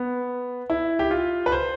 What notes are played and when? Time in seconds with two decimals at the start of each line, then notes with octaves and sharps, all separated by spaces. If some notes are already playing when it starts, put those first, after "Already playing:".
Already playing: B3
0.70 E4
0.99 G4
1.11 F4
1.46 B4
1.52 C5